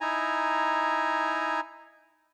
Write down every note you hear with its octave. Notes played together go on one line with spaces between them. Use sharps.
D#4 E4 G#5 A#5